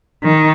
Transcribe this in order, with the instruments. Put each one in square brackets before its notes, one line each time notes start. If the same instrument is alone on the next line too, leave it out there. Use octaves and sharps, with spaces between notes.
[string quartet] D#3